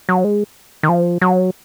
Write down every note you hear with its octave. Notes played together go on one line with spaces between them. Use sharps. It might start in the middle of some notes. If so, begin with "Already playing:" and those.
F#3
G#3
D#3
F3
F#3